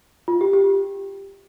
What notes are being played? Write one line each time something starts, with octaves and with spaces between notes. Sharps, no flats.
F4
G4
G4